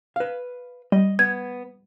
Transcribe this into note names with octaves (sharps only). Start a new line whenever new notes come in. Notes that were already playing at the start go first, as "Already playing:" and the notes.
B4 F5
G3 D#5
B3 G#6